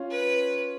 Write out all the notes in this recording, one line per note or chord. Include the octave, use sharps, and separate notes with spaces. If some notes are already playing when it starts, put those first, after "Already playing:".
Already playing: C#4 F4
B4